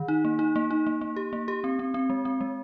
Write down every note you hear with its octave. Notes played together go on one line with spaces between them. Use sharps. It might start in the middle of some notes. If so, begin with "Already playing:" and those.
Already playing: D#3
D#4
A#3
D#4
A#3
D#4
A#3
A#3
G4
A#3
G4
C4
C4
C4
G#3
C4
G#3